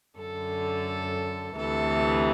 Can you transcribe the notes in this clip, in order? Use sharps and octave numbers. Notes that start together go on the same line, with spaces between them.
F#2 D3 A4
D2 C3 E3 A4